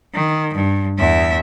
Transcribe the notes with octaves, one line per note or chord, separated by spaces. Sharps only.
D#3
G2
E2 E5